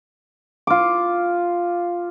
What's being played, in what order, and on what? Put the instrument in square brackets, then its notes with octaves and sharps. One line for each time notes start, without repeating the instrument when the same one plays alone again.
[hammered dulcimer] F4 D6